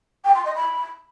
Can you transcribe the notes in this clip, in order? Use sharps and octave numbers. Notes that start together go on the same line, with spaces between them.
G5
C6
D#5
B5